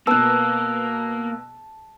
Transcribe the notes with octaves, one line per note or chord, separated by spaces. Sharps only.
B2 A#3 B3 A5 E6 F#6